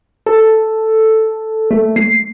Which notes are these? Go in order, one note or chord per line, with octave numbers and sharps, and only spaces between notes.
A4
A3
C7